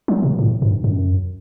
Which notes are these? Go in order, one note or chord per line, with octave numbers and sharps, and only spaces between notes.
F#3
B2
A2
G2
F#2